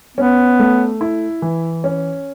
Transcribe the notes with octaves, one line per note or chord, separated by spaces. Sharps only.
B3 C#4
A3
E4
E3
C#4